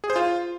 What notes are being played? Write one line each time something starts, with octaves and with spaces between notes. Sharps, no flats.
G#4
C5
F4